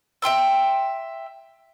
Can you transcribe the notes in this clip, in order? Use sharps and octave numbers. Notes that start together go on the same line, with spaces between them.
E5 G5 C6 E6